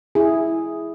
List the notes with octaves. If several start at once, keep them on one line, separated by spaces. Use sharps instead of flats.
E4 G#4